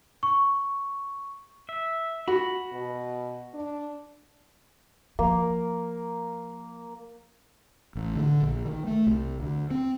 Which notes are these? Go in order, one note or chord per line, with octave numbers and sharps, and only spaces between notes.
C#6
E5
F#4 B5
B2
D4
F3 A#3
A1
D3
A#1
D#3
A3
C2
D2
C4